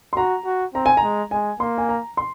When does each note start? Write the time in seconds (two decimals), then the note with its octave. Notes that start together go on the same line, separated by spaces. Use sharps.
0.13 C6
0.17 F#4 A#5
0.45 F#4
0.74 C4 A#5
0.86 G#5
0.97 A#5
1.03 G#3
1.31 G#3 G#5
1.60 A#3 C6
1.78 G#5
1.89 A#5
2.17 C6